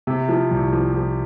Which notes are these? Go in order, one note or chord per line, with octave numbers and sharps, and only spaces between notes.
C3
F3
C2
F3
F3